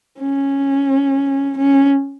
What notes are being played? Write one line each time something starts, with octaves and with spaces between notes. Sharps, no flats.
C#4
C#4